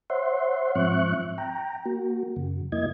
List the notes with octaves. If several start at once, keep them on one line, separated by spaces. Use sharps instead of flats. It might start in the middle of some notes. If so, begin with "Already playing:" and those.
C5 C#5 E5 F#5 C6
G#2 F3 C4 E5 C#6 F#6
G5 A#5
A#3 F#4
F#2 C#3
F2 A#3 E4 D#5 G#6